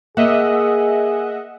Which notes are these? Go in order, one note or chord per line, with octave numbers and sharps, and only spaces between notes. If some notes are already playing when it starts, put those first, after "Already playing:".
A#3 G#4 D#5 E5 F#5